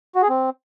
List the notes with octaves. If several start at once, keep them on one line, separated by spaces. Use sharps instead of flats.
F#4
G#4
C4